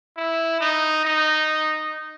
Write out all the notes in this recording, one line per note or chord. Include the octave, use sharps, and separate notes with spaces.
E4
D#4
D#4